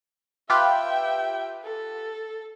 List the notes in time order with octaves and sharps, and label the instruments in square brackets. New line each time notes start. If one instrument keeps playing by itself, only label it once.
[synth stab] F4 G4 B4 [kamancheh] E5 G5
[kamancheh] A4